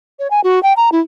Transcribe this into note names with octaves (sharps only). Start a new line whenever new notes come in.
C#5
G#5
F#4
G5
A#5
E4